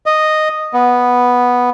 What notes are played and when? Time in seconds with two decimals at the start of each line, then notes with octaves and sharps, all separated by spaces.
0.06 D#5
0.74 B3